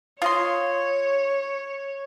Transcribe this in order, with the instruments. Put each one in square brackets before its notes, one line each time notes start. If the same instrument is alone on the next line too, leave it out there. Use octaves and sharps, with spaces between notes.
[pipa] F4 D#5 C6 [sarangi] C#5